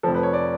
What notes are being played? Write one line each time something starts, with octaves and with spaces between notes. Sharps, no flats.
F1 F2 F3 A4
B4
C#5
D5